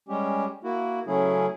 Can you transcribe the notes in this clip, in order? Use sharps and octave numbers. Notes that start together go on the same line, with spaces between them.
G3 G#3 C#4 G4
A#3 E4 F#4
C#3 F#3 A3 C#4 E4 G#4